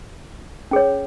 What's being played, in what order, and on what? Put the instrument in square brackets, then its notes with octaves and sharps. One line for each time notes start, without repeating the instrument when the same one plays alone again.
[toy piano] C#4 G#4 C#5